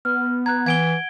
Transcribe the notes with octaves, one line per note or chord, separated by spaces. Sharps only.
B3 F6
A#5 F#6 G#6
E3 F#5 G#6 D7 G7